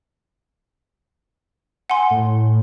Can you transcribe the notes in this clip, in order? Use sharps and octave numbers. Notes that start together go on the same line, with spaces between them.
F#5 G#5 C6
A2